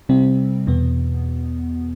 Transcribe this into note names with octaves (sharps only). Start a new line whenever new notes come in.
C3 G3 C4
E2 B2 B3